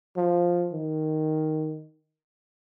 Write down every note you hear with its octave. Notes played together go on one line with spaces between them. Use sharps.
F3
D#3